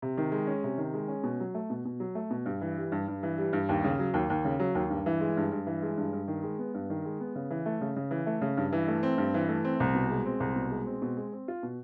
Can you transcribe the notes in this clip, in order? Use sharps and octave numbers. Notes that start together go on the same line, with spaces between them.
C3
D#3
G#3
C#4
C3
D#3
G#3
C#4
B2
F#3
A3
B2
B2
F#3
A3
B2
G2
E3
G3
G2
G2
E3
G3
G2
D#2
C#3
F#3
D#2
D#2
C#3
F#3
D#2
G2
E3
G#3
G2
G2
E3
G#3
G2
G2
D#3
G#3
B3
G2
D#3
G#3
B3
C#3
E3
A3
C#3
C#3
E3
A3
C#3
G2
E3
A3
C4
G2
E3
A3
C4
C2
B2
G#3
C4
C2
B2
G#3
C4
B2
G#3
C4
F4
B2